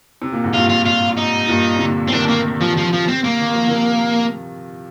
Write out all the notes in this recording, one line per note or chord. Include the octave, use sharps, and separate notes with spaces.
C3
A#2
G#2
G2 A#2 F4
F4
F4
D#4
G2 A#2
C3
A#2 D3
D3 C4
C3 D#3 D4
A#3
F3
F3
F3
C4
A#3
D#3
F3
C3 D#3